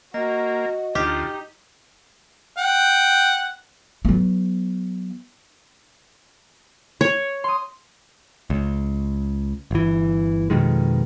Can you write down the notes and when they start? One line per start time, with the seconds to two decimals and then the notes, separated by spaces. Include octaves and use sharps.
0.14 A#3 F#4 D#5
0.95 D2 D#4 F4 G4
2.58 F#5 G5
4.05 F#3 B3
7.01 C#5
7.44 C6 D#6
8.50 C#2
9.71 G1 E3
10.50 F2 B2 D#3 G#3